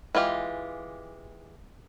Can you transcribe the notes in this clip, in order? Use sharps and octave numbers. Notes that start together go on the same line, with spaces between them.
E3 G#3 F4 G4